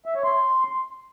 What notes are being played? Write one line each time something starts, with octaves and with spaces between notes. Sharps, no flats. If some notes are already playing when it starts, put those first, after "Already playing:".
E5
C#5
C6